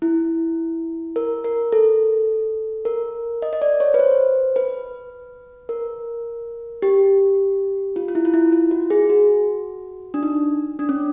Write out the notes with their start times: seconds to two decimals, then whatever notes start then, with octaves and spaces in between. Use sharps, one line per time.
0.02 E4
1.16 A#4
1.44 A#4
1.72 A4
2.85 A#4
3.42 D#5
3.53 D#5
3.62 D5
3.80 C#5
3.94 B4
3.99 C5
4.56 B4
5.69 A#4
6.82 G4
7.96 F4
8.08 F4
8.15 E4
8.25 F4
8.34 E4
8.52 F4
8.71 F#4
8.90 G#4
9.10 F#4
10.14 D4
10.23 D#4
10.79 D4
10.89 C#4